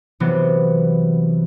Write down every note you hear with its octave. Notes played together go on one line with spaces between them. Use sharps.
C3 E3 F#3 B3